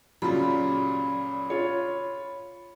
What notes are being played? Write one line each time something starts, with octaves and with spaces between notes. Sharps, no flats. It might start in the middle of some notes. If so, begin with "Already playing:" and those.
A#2 C#3 F#3 G3 F4 B5
F4 C#5